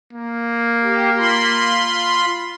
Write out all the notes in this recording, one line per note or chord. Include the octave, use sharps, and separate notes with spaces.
A#3
G4
F4 B5 C6